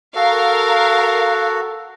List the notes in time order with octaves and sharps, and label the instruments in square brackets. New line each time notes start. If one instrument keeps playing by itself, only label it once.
[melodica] F#4 A4 [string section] A#4 F5